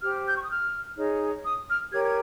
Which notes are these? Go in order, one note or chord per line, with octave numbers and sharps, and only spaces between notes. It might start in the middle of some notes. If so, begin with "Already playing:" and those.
G4 C5 F6
G6
C#6
D#6
F6
D#4 G#4 C#5
D#6
F6
G4 A#4 C#5 G#6
G#6